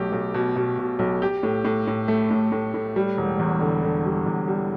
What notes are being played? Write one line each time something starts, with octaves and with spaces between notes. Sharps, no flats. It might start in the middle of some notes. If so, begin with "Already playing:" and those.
Already playing: B1 A3 G4
B1
B2
B2
B2
B1
G4
A2
A2
A2
A3
A2
A2
A2
G3
E1
E2
D3
D3
G3
E2
G3